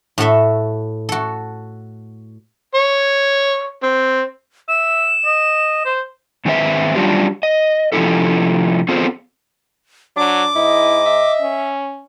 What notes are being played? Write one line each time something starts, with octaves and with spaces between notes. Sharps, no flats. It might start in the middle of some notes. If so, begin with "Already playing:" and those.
A2 F#4 A4 E5
F#4 A4
C#5
C4
E5 E7
D#5
C5
G#2 D#3 G#3 C4 B4 E5
F#3 G3 C#4 D4 F4 G4
D#5
C3 F3 G3 C#4 E4 A4
B3 C4 F4 G#4 A4 C5
F#3 D4 D6
G#2 E4 D#5
E5
C#4